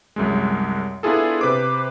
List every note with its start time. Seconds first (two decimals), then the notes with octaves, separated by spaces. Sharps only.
0.16 C2 F#2 G#3
1.03 B3 D4 E4 F4 G#4 A4
1.41 C3 B4 C5 D6